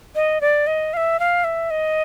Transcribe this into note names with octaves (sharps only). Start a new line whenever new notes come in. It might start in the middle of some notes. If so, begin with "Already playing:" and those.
D#5
D5
D#5
F5
E5
F5
E5
D#5